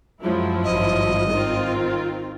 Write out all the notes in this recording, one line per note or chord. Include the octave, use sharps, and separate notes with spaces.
F#2 F3 F#3 G#3 E4
G#1 G2 D#5
D#3 C4 F4